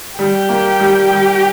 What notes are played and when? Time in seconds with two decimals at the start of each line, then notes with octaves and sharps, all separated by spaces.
0.19 G3 G4
0.49 A#3
0.80 G3
1.10 G3